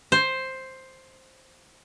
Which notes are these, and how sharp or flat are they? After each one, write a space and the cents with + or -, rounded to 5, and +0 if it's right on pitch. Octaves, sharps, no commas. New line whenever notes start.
C5 +5